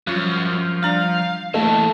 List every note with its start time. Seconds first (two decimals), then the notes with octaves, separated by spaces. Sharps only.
0.07 F#2 F3 G3 F4
0.83 G3 D4 D5 F5
1.54 E3 A3 A#3